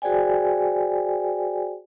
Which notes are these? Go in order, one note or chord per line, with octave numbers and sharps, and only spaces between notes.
F#4 G#4 C5 D5 G5 G#5